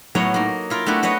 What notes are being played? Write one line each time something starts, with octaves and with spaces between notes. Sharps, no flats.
A2 F#3 A3 B3 C#5 A#5
A#3 D#4
E4 F4 A#4
A3 B3 D4 E4 F#4 G4
F#4 B4 C#5 D#5